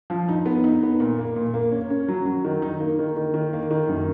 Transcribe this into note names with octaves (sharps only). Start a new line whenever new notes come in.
F3
D#4
B3
D#4
B3
A#2
A#3
A#2
A#3
C#4
C#4
F#3
F#3
D#3
D#4
A#3
D#3
D#3
D#3
A#3
D#3
F#2